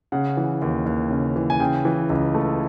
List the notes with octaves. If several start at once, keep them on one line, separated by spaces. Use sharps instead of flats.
C#3 F#5
E3
D#2
D#2
C#3
E3
G#5
C#3 G5
E3
C#2
A3